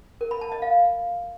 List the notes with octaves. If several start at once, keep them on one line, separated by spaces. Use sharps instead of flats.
A#4
B5
A5
D#5
F5